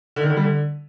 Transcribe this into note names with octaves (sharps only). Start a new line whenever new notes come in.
D3
D#3
D3
G3
D3